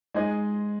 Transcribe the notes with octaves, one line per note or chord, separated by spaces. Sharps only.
G#3 D#4 G#4 C5 D#5